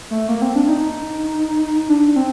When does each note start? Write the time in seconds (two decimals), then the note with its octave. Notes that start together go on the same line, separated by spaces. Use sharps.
0.11 A3
0.29 A#3
0.42 C4
0.55 D4
0.69 D#4
1.89 D4
2.16 C4